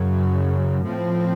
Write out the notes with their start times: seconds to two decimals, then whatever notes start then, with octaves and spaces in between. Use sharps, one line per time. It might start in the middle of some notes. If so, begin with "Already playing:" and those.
Already playing: F#2 C#3 F#3
0.85 A2 F3 C4